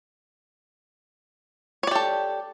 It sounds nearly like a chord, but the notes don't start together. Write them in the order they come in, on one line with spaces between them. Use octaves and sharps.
C#5 D5 G4 A4